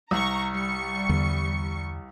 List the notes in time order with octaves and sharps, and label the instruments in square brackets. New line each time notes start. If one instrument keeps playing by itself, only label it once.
[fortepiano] C2 [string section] A#5 C#6
[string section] G3 C#6 C#7
[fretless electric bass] E2 D3